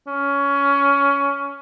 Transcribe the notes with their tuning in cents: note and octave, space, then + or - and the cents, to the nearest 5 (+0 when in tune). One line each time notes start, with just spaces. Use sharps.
C#4 +20